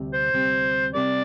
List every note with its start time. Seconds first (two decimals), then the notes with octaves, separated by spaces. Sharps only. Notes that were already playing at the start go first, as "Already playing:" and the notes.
Already playing: D2 C3 G3 C4
0.13 C5
0.33 D2 C3 G3 C4
0.94 C3 G3 C4 G4 A#4 D5